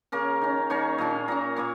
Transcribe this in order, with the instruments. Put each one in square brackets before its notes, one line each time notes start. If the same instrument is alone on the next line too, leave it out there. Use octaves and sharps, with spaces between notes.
[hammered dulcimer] C#3 A#3 C#4 A#4
D#3 C#4
D#3 A#3 C#4 C#5
A#2 A#3 C#4 F5
A#2 A#3 C#4 A#5
A#2 A#3 C#4